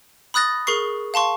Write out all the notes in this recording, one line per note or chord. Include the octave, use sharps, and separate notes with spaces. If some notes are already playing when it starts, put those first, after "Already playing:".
B5 D#6 F#6 A6 A#6
G#4 A#4 C#6 C7
F5 A5 C6 C#6